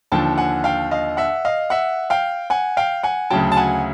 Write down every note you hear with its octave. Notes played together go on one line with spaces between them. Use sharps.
D#2 D3 F3 G5 A5
F#5 G#5
F5 G5
D#5 F5
E5 F#5
D#5 F5
E5 F#5
F5 G5
F#5 G#5
F5 G5
F#5 G#5
D2 C#3 F#3 G5 A5
A5
F#5 G#5